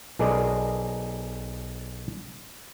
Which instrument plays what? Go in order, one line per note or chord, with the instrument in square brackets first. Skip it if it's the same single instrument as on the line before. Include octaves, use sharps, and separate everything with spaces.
[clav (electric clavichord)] B1 G#4 A#4 D5 D#5